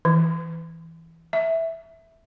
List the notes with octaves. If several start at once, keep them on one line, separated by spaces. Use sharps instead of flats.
E3
E5